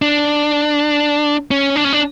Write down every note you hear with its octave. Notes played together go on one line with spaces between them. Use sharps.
D4
C#4
D4
C#4
D4